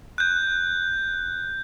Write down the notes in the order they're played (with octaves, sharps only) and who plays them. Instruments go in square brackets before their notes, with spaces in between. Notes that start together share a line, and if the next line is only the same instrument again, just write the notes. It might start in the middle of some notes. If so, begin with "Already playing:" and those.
[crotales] F#6 G6